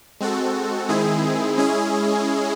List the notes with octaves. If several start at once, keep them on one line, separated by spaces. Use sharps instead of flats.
G#3 C4 F#4 A4
D#3 G#3 C4 E4 G#4
G#3 C#4 E4 G#4